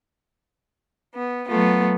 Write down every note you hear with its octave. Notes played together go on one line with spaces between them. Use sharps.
B3
F#3 A3 B3 F4